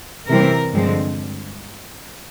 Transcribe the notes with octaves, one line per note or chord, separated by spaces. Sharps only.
C3 E3 G3 C4 A#4
G2 D3 F3 G#3 C4